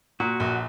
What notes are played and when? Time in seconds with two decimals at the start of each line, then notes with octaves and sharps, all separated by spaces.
0.20 A#2 F#4
0.40 A#1